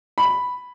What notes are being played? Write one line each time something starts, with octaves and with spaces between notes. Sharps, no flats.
B5